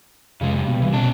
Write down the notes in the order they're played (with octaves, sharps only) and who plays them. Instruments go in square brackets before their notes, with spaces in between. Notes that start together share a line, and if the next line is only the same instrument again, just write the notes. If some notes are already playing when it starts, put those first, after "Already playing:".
[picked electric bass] F1 [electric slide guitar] C#3 G#3
[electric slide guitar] G2
[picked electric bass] B2
[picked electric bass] C2 G3 [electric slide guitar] E3
[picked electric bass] B2 [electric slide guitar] C#4 A5